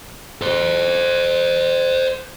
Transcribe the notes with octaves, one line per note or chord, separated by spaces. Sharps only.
A4 C5